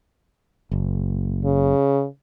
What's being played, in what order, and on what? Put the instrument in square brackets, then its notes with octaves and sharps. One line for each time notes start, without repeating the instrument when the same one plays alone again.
[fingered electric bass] F#1
[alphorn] C#3